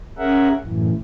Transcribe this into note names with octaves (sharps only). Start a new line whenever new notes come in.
C#4 G#4 A#4 E5 F#5
F#2 A2 E3